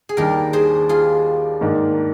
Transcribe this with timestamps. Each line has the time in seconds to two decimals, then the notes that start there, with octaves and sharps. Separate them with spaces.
0.09 G#4
0.17 D#2 D#3 G3 D4 G4 A#4
0.53 G#4 C5
0.89 F4 G#4
1.61 G#2 D#3 A#3 D4